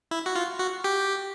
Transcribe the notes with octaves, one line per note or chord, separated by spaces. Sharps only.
E4
F#4
F4
F#4
G4